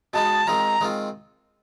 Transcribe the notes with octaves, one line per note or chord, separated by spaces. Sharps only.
B2 G#3 B3 D#4 A5
D#3 G#3 C4 F4 A#5
D#3 G#3 C4 F4